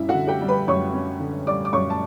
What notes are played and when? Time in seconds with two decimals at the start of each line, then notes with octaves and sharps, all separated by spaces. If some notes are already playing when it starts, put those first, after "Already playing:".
Already playing: F#2 G3 C#4 E4 E5
0.09 F#4 F#5
0.14 D3
0.27 G4 G5
0.41 G3
0.48 B4 B5
0.68 F#2 C#5 C#6
0.93 C#4
1.20 D3
1.47 G3 D5 D6
1.65 D6
1.73 F#2 C#5 C#6
1.90 A5